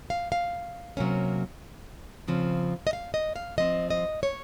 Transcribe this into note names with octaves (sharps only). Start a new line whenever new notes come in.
F5
F5
C3 F#3 A#3 C#4
C#3 F3 C4
D#5
F5
D#5
F5
F3 C4 D#5
D#5
C#5